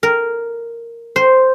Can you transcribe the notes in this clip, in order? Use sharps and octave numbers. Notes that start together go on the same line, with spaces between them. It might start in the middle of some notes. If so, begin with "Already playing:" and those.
A#4
C5